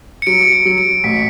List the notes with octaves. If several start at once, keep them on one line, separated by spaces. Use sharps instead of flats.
C#7
F#3 D7
D7
C#7
F#3
D7
A1 B6